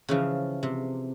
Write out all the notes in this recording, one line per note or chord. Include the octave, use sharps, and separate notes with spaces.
C#3 E3 F3
C3